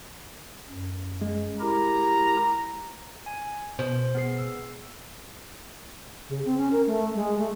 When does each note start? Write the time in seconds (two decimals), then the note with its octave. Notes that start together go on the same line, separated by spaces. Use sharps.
0.70 F#2
1.21 G#3
1.60 E4 G4 A#4 A#5
3.26 G#5
3.79 B2 C5
4.15 B3 G#4 C7
4.39 E6
6.29 C#3
6.45 C4
6.57 C#4
6.72 A#4
6.86 A3
7.15 G#3
7.38 A3